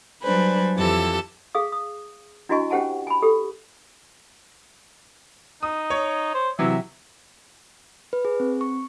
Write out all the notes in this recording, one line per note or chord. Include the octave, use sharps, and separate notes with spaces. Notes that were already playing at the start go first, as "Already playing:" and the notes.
F#3 G3 D4 B4 C5 G#5
F2 E3 G4 A4 E6
G#4 F5 D#6
D#6
D4 E4 F#4 D#5 G#5 C#6
C#4 G4 C5 F#5 G#5 A5
G#5 B5
G4 A4
D#4 D#6
C#5
C5
C3 E3 F#3 E5
B4
G#4
C4
C#6